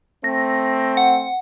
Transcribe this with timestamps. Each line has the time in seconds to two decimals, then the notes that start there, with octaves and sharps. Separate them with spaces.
0.24 A3 C4 A#6
0.97 F#5